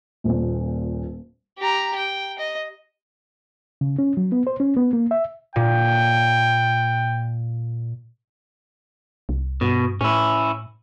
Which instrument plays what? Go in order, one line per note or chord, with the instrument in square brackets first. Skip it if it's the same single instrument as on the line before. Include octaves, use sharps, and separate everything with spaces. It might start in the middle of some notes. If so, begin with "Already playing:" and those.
[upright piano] D#1 A#2
[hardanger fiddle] G4 A#5
G5
D#5
[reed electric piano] C#3
C#4
F#3
B3
C5
C#4
B3
A#3
E5
[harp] A#2 [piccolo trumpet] G5
[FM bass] C2
[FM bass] G2 [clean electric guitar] B2
[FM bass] A2 [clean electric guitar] C#4 E4